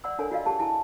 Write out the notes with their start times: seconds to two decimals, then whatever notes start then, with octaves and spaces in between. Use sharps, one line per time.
0.04 D5 F#5 C6 E6
0.19 D4 A4 A#4 C#5 G#5 C6
0.31 F4 F#4 D5 D#5 F5
0.46 G4 G#4 A5
0.59 E4 G4 G#4 G#5 A5